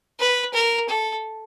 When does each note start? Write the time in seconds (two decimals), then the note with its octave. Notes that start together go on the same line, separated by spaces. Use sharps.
0.19 B4
0.54 A#4
0.89 A4